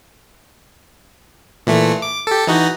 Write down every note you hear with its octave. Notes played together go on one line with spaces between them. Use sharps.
A#2 E3 A3
D6
G4 A4
E3 D#4 F#4